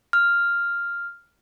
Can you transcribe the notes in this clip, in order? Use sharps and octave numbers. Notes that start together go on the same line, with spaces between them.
F6